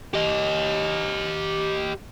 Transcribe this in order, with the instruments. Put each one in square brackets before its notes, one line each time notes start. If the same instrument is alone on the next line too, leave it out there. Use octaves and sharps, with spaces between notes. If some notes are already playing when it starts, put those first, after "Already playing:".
[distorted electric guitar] G4 D#5